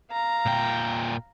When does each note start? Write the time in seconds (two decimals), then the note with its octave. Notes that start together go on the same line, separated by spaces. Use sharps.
0.12 F5 A#5
0.46 A#2 G5